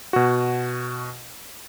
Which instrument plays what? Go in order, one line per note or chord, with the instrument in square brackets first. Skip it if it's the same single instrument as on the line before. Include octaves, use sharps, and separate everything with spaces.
[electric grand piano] B2 F#4